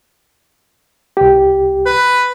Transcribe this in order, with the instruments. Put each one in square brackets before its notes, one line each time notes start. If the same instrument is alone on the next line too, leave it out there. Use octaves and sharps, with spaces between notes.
[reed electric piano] C2 G4
[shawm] B4